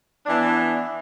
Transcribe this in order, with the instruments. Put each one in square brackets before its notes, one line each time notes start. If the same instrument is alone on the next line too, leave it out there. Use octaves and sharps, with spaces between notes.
[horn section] E3 B3 D4